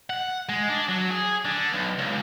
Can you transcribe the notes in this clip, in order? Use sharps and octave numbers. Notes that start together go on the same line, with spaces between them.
F#5
G#3
D4
F#3
G#4
D3
B1
C#2